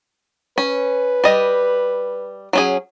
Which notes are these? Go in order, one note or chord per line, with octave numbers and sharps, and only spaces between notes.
C#4 B4
G3 D#5
F#3 C#4 G#4